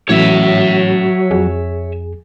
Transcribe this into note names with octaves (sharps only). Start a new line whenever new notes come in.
A2 E3 F#3 A3 C#4 C#5 E5
F2 G#4